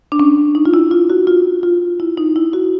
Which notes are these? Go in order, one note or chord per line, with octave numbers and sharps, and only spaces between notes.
D4
C#4
D#4
F4
E4
F4
F#4
F4
F4
E4
D#4
E4
F#4